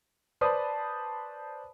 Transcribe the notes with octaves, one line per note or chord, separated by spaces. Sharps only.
B4 C5 D5 A5 B5 D#6